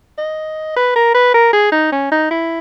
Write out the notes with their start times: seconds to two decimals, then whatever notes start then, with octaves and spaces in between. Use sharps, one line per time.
0.18 D#5
0.77 B4
0.96 A#4
1.14 B4
1.34 A#4
1.53 G#4
1.72 D#4
1.92 C#4
2.12 D#4
2.31 E4